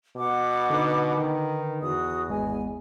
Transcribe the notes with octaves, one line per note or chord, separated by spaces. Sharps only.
B2 F#5 D6
D3 D#4 B4
D#3
E2 F#4 D#6
G#1 G#3 B3 G#5